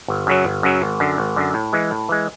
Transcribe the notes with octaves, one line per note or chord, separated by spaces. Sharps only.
G1
F#2 C#3 F#3
G1
F#2 C#3 F#3
G#1
F#2 D3
G#1
F#2 D3
A2
E3 G#3
A2
E3 G#3